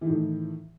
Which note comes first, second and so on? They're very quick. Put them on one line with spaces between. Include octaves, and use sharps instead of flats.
E3 D#3 A2